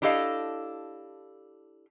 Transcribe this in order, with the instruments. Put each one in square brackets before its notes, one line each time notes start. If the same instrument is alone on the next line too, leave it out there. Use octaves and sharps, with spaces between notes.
[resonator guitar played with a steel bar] D4 E4 G4 A4 D#5 F5